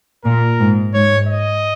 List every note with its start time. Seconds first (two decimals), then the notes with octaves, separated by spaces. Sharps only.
0.25 A#2 A#4
0.60 G#2
0.94 G#2 C#5
1.27 D#5